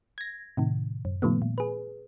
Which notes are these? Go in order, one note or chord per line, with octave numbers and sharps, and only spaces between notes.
G#6 A#6
A2 C3 D#3
F#2
A#2 D#3 F3 G3 A3 B3
A#2
G#4 B4